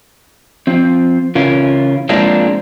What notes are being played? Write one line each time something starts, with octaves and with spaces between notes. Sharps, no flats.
F3 C4
C#3 E3 C#4 F4 A#4
F3 G#3 A#3 C4 D4 F4